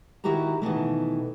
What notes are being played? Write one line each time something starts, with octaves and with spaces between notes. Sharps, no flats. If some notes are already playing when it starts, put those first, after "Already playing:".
D#3 E4 F#4 G4 F#5 A#5
B2 D#3 E3 A3